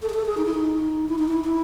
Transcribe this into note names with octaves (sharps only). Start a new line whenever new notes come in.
A4
G#4
A4
G#4
D#4
E4
D#4
E4
D#4
E4
E4